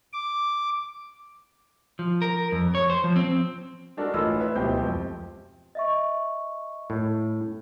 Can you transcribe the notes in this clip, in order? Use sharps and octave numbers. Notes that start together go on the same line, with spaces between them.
D6
F3
A#4
F2
C#5
C5
F3
C4
G#3 D4 F#4 A4 A#4
A1 F4 D#5 B5 E6
E4 B4 E5
D1 C#2 B2 G4 C5 G6
F2
D#5 E5 C#6
A2